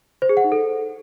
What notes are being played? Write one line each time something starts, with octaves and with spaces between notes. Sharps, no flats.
C5
G#4
F#5
D#4
A4